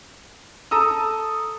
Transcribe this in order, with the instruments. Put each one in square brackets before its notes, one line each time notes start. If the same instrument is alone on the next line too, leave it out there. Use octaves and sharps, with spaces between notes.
[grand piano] A4 A#5 D#6 E6